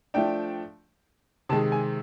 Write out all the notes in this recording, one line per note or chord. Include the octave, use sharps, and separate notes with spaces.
F3 A3 D4 G5
C3 D#3 G#3 A5
G#5